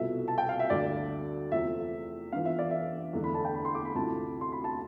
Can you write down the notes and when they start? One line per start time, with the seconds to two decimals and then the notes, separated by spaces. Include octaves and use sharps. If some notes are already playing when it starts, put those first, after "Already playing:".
Already playing: C2 B2 B3 F4 A4 E5
0.28 A5
0.38 G5
0.49 F5
0.60 E5
0.70 D2 D3 G3 D5
1.51 E2 C3 F3 A3 C4 E5
2.32 G2 E3 B3 F4 F5
2.45 E5
2.59 D5
2.71 E5
3.13 E2 D3 A3 D4
3.24 B5
3.34 A5
3.45 G5
3.55 B5
3.65 C6
3.75 D6
3.85 B5
3.95 D2 C3 F3 A3 E4 A5
4.41 C6
4.52 B5
4.64 A5